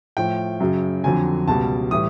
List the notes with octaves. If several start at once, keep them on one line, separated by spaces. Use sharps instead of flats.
A2 F3 G5
F#2 C#3 F#3
F2 D3 F#3 G#5
C#2 B2 G3 A5
A2 E3 G3 D#6